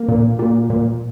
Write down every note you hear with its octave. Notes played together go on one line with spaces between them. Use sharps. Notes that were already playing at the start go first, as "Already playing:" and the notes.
Already playing: A#3
A#2
A#2
A#2